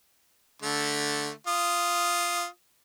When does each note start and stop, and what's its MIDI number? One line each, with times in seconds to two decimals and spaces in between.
0.62 1.30 50
0.62 1.30 57
1.47 2.46 65
1.47 2.46 87